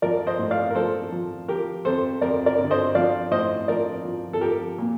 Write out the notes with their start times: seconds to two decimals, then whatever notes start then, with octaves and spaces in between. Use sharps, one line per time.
0.02 F3 A#4 D5
0.27 C5 D#5
0.39 A2
0.51 D5 F5
0.70 A#4
0.75 F3 A4 C5
1.12 F3
1.48 F3 G4 A#4
1.85 F2 A4 C5
2.21 F2 A#4 D5
2.46 A#4 D5
2.58 D3
2.71 C5 D#5
2.95 F3 D5 F5
3.31 A2 C5 D#5
3.68 F3 A#4 D5
4.05 F3
4.33 A4
4.41 F3 G4 A#4
4.78 A#2